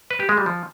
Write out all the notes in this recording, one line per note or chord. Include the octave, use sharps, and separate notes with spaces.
B4
G4
G#3
G3
F3